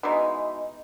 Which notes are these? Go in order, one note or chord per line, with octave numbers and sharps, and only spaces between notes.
B2 E3 G#3 D#4